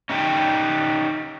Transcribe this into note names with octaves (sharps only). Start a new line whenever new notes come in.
C#4 D#4 G4